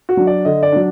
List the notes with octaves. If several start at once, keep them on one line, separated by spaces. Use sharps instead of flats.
F#4
F#3 D4
D5
D3 D#5
D5
F#3 D4